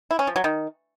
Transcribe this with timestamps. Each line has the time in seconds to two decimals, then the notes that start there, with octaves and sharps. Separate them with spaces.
0.11 E4
0.19 C#4
0.27 F3
0.36 F#3
0.44 D#3